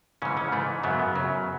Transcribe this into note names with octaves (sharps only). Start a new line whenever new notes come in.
G#2 C#3 E3 C#4
C#3 C#4
G#2 E3 A3
F#2 C#3 F#3 B3
B3
F#2 C#3 F#3